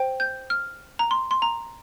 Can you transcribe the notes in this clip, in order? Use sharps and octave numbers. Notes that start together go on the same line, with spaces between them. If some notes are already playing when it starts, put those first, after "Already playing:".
Already playing: C5 G5
G6
F6
A#5
C6
C6
A#5